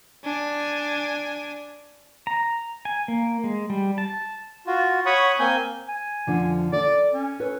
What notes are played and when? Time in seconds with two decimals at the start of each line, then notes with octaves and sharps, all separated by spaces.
0.24 D4 G#5
2.27 A#5
2.85 G#5
3.08 A#3
3.44 G#3
3.70 G3
3.98 A5
4.67 F4 F#4
5.06 C#5 F#5 B5 C#6 D#6
5.39 A#3 C4 G#5 G6
5.88 G#5
6.27 F2 D3 F3
6.73 A4 D5
7.14 C#4
7.40 A4 B4 C#5